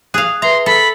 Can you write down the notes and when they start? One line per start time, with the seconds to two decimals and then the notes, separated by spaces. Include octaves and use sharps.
0.14 G#4 F5 F#6
0.42 B4 E5 A#5 C6
0.66 A4 B5